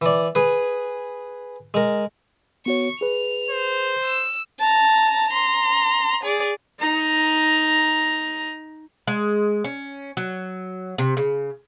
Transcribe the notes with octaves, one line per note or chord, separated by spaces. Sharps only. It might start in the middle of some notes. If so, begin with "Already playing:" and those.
E3 D5
G#4 B4
G#3 A#4
B3 F#4 C#5 C#6
G#4 B4 F7
C5
E6
A5 A#5
A#5 C6
G#4 D5
D#4 A#5
G#3
C#4
F#3
C3
C#3